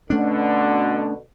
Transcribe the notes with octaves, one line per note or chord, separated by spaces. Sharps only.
B2 D3 A3 C#4 D4